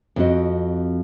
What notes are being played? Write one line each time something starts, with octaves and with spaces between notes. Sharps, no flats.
F2 F3 G#3 C4 F#4 D#5